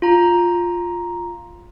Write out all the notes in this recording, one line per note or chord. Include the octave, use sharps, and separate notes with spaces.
F4 A#5